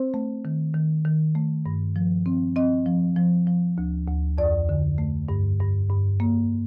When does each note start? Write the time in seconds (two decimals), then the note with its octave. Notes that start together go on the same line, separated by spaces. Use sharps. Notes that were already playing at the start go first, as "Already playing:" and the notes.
Already playing: C4 C5
0.14 A3
0.45 D#3
0.74 D#3
1.05 D#3
1.35 A3
1.66 G2
1.96 F3
2.26 C4
2.56 C4 D#5
2.86 F3
3.16 F3
3.47 F3
3.78 D2
4.08 D2
4.38 F2 D5
4.69 D3
4.98 A3
5.29 G2
5.60 G2
5.90 G2
6.20 A#3